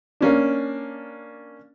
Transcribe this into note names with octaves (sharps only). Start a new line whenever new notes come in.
A#3 C#4 D4